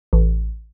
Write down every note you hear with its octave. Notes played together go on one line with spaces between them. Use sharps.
A1